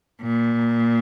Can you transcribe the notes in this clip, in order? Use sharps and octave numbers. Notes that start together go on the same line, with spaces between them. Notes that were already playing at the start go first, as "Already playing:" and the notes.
A#2